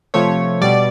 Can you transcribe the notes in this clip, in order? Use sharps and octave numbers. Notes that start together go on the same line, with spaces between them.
C3 F3 A3 C#5
B2 G3 D5